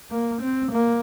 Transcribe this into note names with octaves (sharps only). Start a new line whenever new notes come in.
A#3
C4
A#3